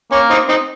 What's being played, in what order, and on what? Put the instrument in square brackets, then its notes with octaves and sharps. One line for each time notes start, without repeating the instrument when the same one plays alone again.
[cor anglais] A#3 [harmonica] C#4
[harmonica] C4 D#4
C4 D#4